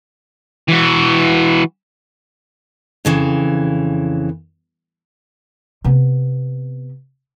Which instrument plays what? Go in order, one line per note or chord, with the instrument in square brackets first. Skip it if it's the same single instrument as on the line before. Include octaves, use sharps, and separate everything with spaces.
[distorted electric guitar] E3 F#4
[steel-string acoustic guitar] F2 C#3 E3
[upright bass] C3 B3